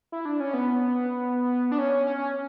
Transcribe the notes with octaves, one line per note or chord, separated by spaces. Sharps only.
E4
D4
C#4
B3
D4
C#4
C#4